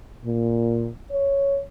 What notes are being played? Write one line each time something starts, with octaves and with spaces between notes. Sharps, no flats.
A#2
C#5